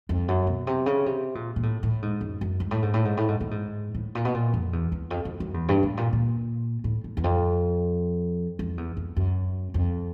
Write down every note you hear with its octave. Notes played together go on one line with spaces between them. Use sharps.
F2
F#2
B2
C3
C#3
C3
A#2
A#2
A2
A2
G#2
F#2
F#2
G#2
A2
G#2
A2
G#2
A2
G#2
A2
G#2
A2
A#2
B2
A#2
F2
E2
E2
F2
F#2
F#2
E2
G2
A2
A#2
A#2
A2
A2
E2
F2
F2
E2
F2
F#2
F2